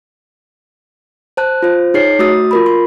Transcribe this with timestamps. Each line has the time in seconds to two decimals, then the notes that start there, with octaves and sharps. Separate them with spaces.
1.37 C5 A5 F#6
1.62 F4 C5
1.94 D#4 G#4 C#5 C7
2.19 A3 F#4 D#6 E6 A6
2.51 F4 A#4 B5
2.66 C6